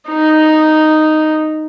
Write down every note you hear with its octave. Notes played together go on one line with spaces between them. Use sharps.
D#4